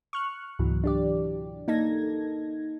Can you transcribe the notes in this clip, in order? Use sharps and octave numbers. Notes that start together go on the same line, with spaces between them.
C#6 F6 F#6
C#2 G#2 B2 E3 F#3
D4 G4 D5
A#3 D#4 A4 G#6 A#6